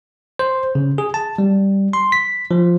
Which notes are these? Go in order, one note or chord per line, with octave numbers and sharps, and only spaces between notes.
C5
C#3
G#4
A5
G3
C6
B6
F3